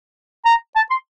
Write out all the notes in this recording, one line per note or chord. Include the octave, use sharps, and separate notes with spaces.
A#5
A5
C6